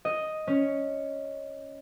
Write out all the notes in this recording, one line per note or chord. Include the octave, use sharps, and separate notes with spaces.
D#5
C#4